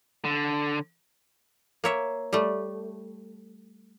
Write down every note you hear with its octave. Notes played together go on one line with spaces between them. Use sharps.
D3
A#3 C#5 E5
G3 A3